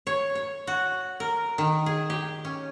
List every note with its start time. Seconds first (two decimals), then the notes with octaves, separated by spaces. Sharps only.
0.07 C#5
0.35 C#5
0.67 F#4
1.20 A#4
1.58 D#3
1.86 G#4
2.10 G4
2.45 C#4